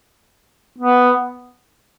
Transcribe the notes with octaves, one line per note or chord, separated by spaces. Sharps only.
B3